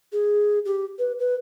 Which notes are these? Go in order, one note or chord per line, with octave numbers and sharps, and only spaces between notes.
G#4
G4
B4
B4